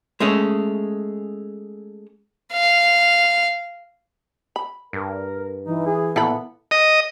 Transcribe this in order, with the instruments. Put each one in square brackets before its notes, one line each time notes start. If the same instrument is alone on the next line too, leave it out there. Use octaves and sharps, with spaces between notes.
[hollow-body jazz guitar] G#3 A3 C#4
[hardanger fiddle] F5
[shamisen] B5
[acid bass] G2 [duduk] A#4
[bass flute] E3 [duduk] D#4
[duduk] G#4
[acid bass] A#2 [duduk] B3 [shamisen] E4 A4 B5
[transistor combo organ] D#5